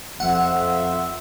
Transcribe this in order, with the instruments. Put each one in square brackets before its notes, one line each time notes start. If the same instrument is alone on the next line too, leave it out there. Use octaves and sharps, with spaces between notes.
[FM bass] E1 [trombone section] F2 [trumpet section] C5 E5 [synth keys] F#5